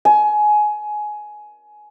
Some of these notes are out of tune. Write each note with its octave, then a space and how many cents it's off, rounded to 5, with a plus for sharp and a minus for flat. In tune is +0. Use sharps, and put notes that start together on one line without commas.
G#5 +20